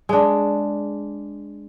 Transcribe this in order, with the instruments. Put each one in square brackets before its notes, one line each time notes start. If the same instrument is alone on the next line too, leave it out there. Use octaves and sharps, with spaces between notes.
[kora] G#3 D4